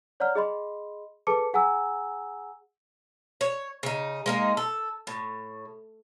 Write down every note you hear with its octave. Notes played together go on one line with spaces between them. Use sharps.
C#5 D5 F#5 A#5 F6
G#4 D#5 B5 C6
G#4 A4 B4 A5 D6 C#7
G#4 F#5 G#5 A#5 E6
C#5
C#3 D#4
G#3 A#3 D#4
A4
A2